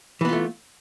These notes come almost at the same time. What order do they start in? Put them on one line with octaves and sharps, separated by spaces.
E3 B3 F4 A3